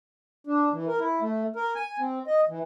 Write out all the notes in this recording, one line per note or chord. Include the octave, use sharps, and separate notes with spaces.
D4
E3
A#4
E4
A3
A#4
G#5
C4
D#5
E3